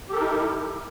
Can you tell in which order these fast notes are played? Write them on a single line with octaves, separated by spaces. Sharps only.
G4 A4 A#4 D#4 E4